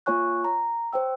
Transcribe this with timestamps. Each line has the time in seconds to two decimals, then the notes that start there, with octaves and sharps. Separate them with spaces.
0.06 A#3 F4 C#5 G#5 C#6 F#6
0.44 A#5
0.93 C5 C#5 G5 E6